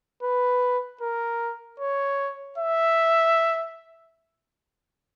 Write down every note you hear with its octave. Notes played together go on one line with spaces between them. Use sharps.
B4
A#4
C#5
E5